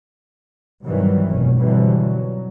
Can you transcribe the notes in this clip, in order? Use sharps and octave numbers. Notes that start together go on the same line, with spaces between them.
G2 C3 D#3 E3 F#3 G3
F1 B2 C#4
F2 B2 D3 E3 F#3 G3
F#3